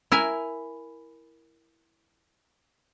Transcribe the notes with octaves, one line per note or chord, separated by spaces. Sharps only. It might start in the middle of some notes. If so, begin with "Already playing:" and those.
E4 A#4 G#5